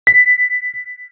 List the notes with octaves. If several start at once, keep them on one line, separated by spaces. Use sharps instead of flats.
B6